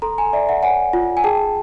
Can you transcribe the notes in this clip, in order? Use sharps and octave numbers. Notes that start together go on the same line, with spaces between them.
A4 A#5 C6
G#5 A#5
D5 E5
E5 F#5
C#5 F#5 G#5
F4
G#5
G#4 G5 A5